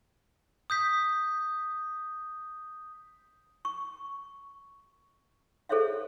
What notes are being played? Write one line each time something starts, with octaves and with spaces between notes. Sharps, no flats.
D#6 G6 B6
C#6
G#4 A4 C5 C#5 E5 F5